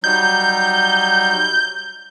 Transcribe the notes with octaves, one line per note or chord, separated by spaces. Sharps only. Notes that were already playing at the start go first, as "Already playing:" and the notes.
F#3 G3 D#4 G6